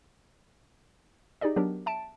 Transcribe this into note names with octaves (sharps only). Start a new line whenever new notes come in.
D#4 G4 G#4 D5 D#5
F#3 B3 D4 G4 A#4
E5 A5 D7